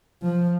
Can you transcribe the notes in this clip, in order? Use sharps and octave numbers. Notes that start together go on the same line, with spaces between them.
F3